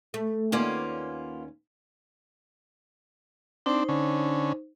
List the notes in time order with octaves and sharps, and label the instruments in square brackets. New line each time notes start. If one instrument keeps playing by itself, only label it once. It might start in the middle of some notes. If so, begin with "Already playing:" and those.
[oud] A3
[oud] D#2 C#4 D5 [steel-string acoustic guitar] A#3 B3 F4
[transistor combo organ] C4 D4 [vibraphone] D#4 C5
[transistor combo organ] D3 C#4